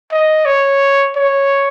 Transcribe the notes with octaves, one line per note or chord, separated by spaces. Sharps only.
D#5
C#5
C#5